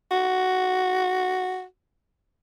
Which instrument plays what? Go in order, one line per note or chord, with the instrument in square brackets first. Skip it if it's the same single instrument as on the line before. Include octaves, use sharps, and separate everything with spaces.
[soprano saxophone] F#4